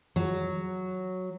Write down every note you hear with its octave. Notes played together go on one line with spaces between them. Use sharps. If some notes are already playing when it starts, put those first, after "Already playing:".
F#3